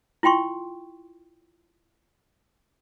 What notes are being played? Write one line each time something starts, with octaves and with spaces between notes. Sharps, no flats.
E4 F4 G5 C6 C#6